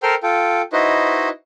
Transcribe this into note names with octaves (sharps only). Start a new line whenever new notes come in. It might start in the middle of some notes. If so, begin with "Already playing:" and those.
A4 A#4 C5 G5 C6 F6
F4 A4 G5
D#4 E4 F#4 B4 C5 D#5